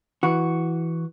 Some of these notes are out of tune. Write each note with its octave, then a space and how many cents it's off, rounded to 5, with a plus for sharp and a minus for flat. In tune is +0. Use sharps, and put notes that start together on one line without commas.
E3 +0 F#4 +0